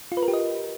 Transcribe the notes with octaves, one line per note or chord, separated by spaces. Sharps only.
F4
B4
A#4
G4
D#5